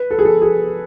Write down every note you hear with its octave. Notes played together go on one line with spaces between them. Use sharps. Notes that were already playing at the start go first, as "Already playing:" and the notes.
Already playing: B4
A4
G#4
A4
G#4